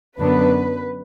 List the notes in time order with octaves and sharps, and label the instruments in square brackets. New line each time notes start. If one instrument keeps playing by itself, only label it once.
[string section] F#2 D3 F#3 B3 D4 B4